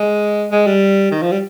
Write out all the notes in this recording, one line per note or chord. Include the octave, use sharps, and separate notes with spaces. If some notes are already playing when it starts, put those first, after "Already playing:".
Already playing: G#3
G#3
G3
D#3
F3
G3